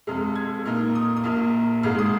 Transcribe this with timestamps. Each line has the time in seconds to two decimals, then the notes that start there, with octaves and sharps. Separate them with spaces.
0.07 F2 C3 G#3 F6
0.35 G#6
0.65 A#2 A#3 D#4 F6
0.95 D#6
1.17 D#6
1.24 A#1 A#2 A#3 F6
1.83 G#1 G#2 G#3 F6
1.99 D#6